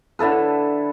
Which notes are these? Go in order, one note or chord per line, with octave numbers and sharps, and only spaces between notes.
D3 E4 A4 B4